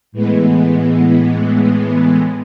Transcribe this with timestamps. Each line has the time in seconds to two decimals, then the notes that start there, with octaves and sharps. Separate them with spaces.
0.12 A2 E3 G#3 B3